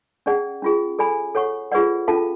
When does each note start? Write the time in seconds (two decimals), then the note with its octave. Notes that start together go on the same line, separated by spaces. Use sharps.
0.26 C#4 G#4 D5 F#5
0.62 C#4 F4 G#4
0.99 A4 D5 G#5 B5
1.35 A4 C#5 F#5 C#6
1.72 F4 G#4 B4 D5 F#5
2.08 C#4 F4 A4 F5 A5